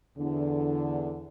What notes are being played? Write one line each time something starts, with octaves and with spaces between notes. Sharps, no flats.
E2 D3